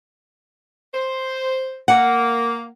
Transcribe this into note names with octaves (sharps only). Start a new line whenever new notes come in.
C5
A#3 F#5